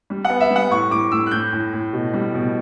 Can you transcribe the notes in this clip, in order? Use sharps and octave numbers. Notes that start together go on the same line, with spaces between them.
G3
F#5
B3
E5
G3
F#5
A2 C#6
A2 D6
A2 E6
F#6
A2 G6
A2
A2
B2
G3
B2